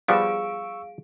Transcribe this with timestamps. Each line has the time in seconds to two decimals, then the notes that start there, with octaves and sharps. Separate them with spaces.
0.08 F3 G3 B3 G#4 F5 C#6 E6 D7